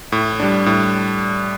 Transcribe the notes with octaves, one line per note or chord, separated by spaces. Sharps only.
A2
G3 D4
A2